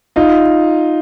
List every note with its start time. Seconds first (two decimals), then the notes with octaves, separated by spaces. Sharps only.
0.16 D#4 F4